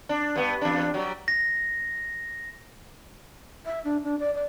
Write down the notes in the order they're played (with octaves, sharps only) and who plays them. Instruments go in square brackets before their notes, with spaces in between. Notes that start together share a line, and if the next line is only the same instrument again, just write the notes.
[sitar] D4
G2 B3
E2 D4
F#3 G3
[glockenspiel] A#6
[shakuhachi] E5
D4
D4
D5
D5